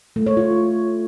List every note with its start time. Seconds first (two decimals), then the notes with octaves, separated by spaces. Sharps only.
0.16 A3
0.26 C#5
0.37 F4